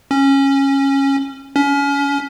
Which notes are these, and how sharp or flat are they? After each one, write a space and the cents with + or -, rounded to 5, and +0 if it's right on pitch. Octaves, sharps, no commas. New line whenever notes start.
C#4 -15
C#4 +30